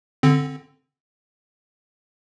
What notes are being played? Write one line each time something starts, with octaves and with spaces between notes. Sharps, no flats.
D3 C4